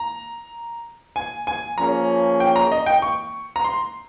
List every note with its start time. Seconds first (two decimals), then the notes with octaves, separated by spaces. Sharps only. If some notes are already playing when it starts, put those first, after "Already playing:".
Already playing: A#5
1.16 G#5
1.47 G#5
1.78 F3 A#3 C#4 G#4 C#5 A#5
2.40 G5
2.56 A#5
2.72 D#5
2.86 G5
3.02 C#6
3.56 A#5
3.64 C6